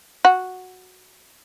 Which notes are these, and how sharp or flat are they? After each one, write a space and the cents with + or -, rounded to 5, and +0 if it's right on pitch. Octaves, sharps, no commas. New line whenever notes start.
F#4 -5